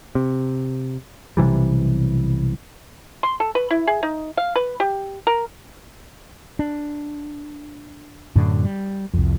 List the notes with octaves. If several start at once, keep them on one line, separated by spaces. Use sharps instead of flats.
C3
B1 C3 E3 G3
C6
A4
B4
E4
G#4
D#4
F5
B4
G4
A#4
D4
F#2 A2 D3
G3
C2 F2